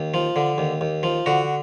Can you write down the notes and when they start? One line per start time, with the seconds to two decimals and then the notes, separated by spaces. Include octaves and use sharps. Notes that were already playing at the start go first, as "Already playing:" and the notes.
Already playing: D#2
0.14 F3
0.36 D3
0.58 D#2
0.81 D#2
1.03 F3
1.26 D3 F#4